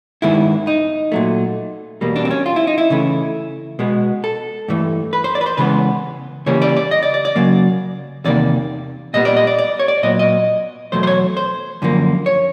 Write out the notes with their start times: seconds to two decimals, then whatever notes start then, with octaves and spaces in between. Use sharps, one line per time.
0.22 G2 D#3 G#3 B3 E4
0.67 D#4
1.12 A#2 F#3 A3
2.01 E2 B2 G3 A#3
2.16 D4
2.25 C4
2.31 C#4
2.46 F4
2.56 E4
2.67 D#4
2.78 E4
2.90 C#3 E3 A3
3.79 B2 G#3 B3
4.24 A4
4.68 G2 E3 A3
5.13 B4
5.24 C5
5.35 D5
5.41 B4
5.46 C5
5.57 C#3 E3 G#3 B3 B4
6.46 C#3 E3 G3 A#3 C#5
6.62 D5
6.77 D5
6.91 D#5
7.03 D5
7.14 D5
7.25 D5
7.36 C#3 F#3 A#3
8.25 E2 C3 D#3 A#3 D5
9.14 A#2 G3 B3 D#5
9.25 D5
9.37 D#5
9.47 D5
9.59 D5
9.79 C#5
9.88 D5
10.03 A#2 F#3 B3 D#5
10.19 D#5
10.92 E2 B2 F#3 A3 C5
11.03 C5
11.07 C#5
11.37 C5
11.82 F#2 D3 F3 A#3
12.26 C#5